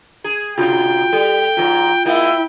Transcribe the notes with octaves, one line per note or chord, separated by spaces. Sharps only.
G#4
G#2 C3 F4 F#4 G5
G3 A4
G#2 F3 F4 C5
G#3 A#3 E4 G5